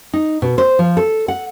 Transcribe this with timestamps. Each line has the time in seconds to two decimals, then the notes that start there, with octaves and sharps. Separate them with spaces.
0.13 D#4
0.42 B2
0.58 C5
0.79 F3
0.97 A4
1.28 F#5